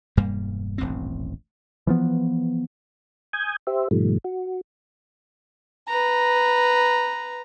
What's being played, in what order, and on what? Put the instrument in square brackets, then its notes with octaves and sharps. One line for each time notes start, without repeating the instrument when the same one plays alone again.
[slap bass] E1 G2 G3 A#3
D#1 A1 G2 C4
[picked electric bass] E3 F3 B3
[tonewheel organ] G#5 D#6 G6 G#6
G4 C5 E5
G#2 B2 D#3 F3 G3 A3
F#4
[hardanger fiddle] B4 A#5